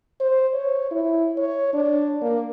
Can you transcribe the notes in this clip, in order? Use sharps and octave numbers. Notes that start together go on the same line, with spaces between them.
C5
C#5
E4
C#5
D4
A#3